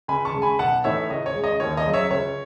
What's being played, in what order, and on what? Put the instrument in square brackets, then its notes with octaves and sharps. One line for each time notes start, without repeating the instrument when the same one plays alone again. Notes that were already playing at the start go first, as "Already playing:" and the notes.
[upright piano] C#2 G#5 B5
A5 C#6
C#3 G#3
G#5 B5
B1 F#5 A5
A2 E3 A3 D#4 C#5 E5
C#2 D#5
C#5
C#3 G#3
D#5
D#2 C#5
D#5
C#3 F#3
C#5 E5
C#2 C#5